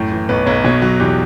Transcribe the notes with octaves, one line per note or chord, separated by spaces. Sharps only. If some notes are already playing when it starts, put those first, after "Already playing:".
Already playing: F#2 A2
E3
B1 B4
B1 C#5
B2 C#5
F#3
E2 G4